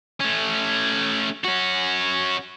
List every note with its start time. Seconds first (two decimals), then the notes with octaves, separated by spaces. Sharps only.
0.20 A3 C#4
1.44 C#4 F#4